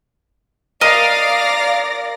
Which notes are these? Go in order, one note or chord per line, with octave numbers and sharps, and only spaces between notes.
A#4 D5 D#5 F5 A#6